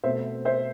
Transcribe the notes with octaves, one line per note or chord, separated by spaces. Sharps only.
B2 A3 C4 C5 E5
C5 E5